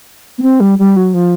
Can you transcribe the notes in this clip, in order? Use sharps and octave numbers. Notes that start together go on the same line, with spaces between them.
B3
C4
G3
G3
F#3
F3